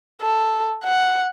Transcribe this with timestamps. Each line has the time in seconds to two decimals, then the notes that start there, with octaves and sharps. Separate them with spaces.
0.22 A4
0.84 F#5